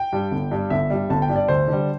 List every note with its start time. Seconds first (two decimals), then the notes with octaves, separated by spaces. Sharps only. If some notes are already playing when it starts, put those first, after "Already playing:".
Already playing: G5
0.13 G2 G3
0.32 G1
0.51 G2 G3
0.70 G1 E5
0.90 G2 G3
1.10 G1 A5
1.22 G5
1.29 G2 G3
1.36 D5
1.48 D2 C5
1.68 D3 G3